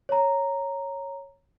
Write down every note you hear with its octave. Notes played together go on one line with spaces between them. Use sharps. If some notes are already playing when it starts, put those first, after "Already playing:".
C#5 A#5